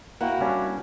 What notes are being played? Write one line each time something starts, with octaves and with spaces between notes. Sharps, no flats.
A#3 E4 F#4 F#5 G5
G3 C#4 D4